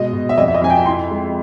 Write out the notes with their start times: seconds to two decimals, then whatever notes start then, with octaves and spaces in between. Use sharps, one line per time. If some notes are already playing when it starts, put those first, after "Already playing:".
Already playing: B2 G#3 D#5
0.13 B2
0.29 E5
0.38 F2 D#5
0.48 E5
0.54 D#5
0.62 F2 G#5
0.70 G5
0.86 E4 C6
1.11 G#3